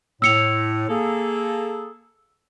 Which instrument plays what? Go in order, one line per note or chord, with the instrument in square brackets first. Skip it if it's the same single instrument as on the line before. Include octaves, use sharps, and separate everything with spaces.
[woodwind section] A2 [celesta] E6 C#7 F7
[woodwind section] A#3 G#4 A4